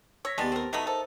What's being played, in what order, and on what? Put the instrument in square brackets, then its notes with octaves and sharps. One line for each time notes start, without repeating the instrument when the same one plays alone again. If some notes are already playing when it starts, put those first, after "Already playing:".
[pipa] C#5 [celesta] E6 A#6 B6
[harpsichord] D#2 B3 G4 [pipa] G3 G#3 [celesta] A5 A6
[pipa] C4 A#4
[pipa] F#3 A3 B3 [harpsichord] D#4
[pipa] A4 [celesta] A#4 C5 E5